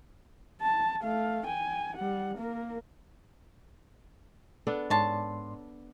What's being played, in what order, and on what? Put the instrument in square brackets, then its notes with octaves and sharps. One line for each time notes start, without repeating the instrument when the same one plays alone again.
[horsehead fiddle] A5
A3 F5
G5 G#5
G3 F#5
A#3 A#4
[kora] B3 D4 A4
[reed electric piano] G#2 D5 C6 [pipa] C#5 A5